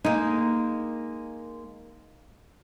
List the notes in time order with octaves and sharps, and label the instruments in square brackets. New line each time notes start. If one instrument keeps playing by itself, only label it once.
[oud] G#3 A#3 [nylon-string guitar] D#4